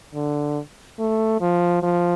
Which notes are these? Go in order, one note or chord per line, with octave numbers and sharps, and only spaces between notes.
D3
A3
F3
F3